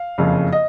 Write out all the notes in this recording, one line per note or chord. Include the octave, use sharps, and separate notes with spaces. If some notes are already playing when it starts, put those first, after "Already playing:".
Already playing: F5
F#1 F2 C#3
D#5